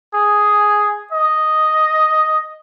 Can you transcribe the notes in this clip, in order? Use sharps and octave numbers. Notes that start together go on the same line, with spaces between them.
G#4
D#5